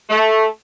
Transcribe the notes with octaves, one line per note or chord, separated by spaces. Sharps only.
A3